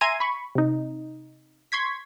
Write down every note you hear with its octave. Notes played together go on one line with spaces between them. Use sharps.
E5 G#5 A#5 C6 G#6 D#7
B5 C#6
C3 D#4
C6 C#6 G#6 B6